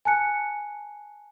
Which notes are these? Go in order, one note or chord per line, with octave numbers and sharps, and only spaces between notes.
G#5 A5 F#6 C#7